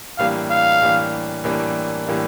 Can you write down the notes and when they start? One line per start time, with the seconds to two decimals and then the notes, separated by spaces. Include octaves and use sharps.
0.18 A2 E3 G3 A#3 D4 F5
0.51 F5
0.81 A2 E3 G3 A#3 D4
1.44 A2 E3 G3 A#3 D4
2.07 A2 E3 G3 A#3 D4